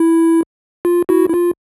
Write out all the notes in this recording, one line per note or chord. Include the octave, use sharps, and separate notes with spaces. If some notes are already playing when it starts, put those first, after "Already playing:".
Already playing: E4
F4
E4 F#4
E4
F4